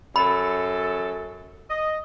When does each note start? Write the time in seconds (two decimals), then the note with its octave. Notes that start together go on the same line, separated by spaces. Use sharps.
0.16 F#2 A4 B5
1.69 D#5